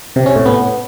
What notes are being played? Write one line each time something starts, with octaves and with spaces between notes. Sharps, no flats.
C3
C#4
A2
B3